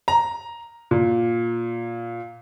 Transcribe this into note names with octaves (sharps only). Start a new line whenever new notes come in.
A#5
A#2